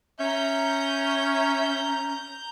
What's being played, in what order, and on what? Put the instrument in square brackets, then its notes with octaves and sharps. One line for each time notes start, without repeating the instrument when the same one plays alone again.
[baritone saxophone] C#4 [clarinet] E5 [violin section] A#5 G6